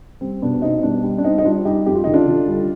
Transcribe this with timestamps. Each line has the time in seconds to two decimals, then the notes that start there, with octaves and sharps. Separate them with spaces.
0.21 G3 C4
0.42 B2 B3 D4
0.62 B2 C4 D#4
0.83 G3 B3 D4
1.03 G3
1.18 D4
1.24 G3 C4 D#4
1.38 D#4
1.44 G3 D4 F4
1.65 G3 D#4 G4
1.86 F2 G4
1.95 F4
2.04 D3 D#4
2.14 D4 F4
2.28 D3
2.48 G3